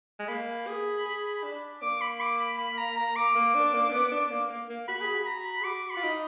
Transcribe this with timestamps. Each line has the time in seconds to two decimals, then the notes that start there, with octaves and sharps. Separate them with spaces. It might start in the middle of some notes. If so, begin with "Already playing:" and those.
0.19 G#3
0.29 A#3 B5
0.67 G#4
1.06 G#4
1.43 D4
1.82 A#3 D6
2.01 B5
2.21 D6
2.40 B5
2.58 B5
2.77 A#5
2.96 A#5
3.16 D6
3.35 A#3
3.55 D4
3.74 A#3
3.88 D4
3.92 B3
4.11 D4
4.31 A#3
4.50 A#3
4.69 A#3
4.88 F#4 B5
5.01 G#4
5.07 B5
5.14 F#4
5.27 A#5
5.46 B5
5.61 G#4
5.64 F#4 D6
5.91 B5
5.96 F4
6.03 D#4